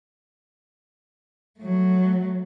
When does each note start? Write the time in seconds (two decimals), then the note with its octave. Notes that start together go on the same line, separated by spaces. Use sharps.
1.59 F#3 A3